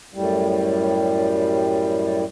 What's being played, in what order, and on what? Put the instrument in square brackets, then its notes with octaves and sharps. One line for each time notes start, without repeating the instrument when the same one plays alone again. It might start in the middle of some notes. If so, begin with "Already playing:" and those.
[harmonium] F#2 A2 G3